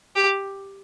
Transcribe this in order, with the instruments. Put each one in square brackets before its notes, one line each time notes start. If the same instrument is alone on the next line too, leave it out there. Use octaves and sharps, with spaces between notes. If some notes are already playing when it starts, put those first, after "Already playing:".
[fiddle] G4